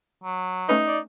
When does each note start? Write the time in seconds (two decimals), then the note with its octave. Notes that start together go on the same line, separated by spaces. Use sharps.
0.24 F#3
0.69 A3 C#4 D#4 B4
0.87 D5